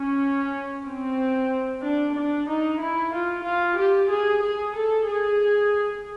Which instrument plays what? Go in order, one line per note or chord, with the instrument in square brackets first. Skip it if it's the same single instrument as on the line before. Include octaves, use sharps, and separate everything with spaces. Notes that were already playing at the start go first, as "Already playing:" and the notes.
Already playing: [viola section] C#4
C4
D4
D4
D#4
E4
F4
F4
G4
G#4
G#4
A4
G#4